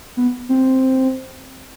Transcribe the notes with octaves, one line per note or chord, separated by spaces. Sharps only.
B3
C4